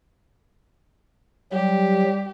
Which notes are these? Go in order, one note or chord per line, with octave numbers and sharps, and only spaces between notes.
F#3 G3 G4